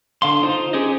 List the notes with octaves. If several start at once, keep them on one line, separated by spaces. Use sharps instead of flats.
D3 F5 C6
D#4 F4 C5
C#4 G4 G#4 C5 D#5